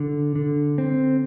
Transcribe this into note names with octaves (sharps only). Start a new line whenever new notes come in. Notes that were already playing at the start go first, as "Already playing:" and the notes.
Already playing: D3
D3
C4